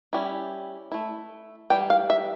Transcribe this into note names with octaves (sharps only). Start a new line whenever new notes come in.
G3 C#4 E4
A3 E4
E3 G3 G5
F5
E5